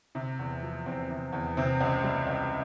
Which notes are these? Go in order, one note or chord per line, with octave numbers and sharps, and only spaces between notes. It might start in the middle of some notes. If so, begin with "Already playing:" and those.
C3
E2
F3
E2 C4
C3
E2
C3 C4
C#2
G3
C#2